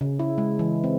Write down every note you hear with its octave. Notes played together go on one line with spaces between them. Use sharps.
C#3
E4
G#3
E3
C4